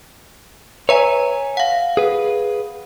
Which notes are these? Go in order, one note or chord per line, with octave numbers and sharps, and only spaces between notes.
B4 C#5 E5 G#5 A#5
F5 F#5
G#4 B4